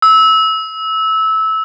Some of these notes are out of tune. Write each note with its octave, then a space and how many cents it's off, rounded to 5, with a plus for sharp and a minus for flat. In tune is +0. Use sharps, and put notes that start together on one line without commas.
E6 -20